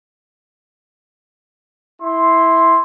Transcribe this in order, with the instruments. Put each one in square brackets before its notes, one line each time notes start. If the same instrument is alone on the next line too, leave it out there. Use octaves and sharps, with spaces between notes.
[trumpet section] E4 C6